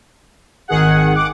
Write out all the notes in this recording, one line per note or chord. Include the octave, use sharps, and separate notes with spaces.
G#1 D#3 G#4 F#5
F#5 D6